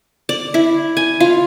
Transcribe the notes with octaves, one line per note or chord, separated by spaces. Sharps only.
D5
E4
G#5
F4